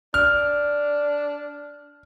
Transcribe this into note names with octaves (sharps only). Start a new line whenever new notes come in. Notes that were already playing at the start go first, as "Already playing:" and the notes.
D4 F6